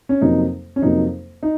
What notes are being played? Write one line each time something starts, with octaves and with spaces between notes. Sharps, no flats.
C#4
F2 C3 F#3 A#3 D#4
C#4
F2 C3 F#3 A#3 D#4
D#4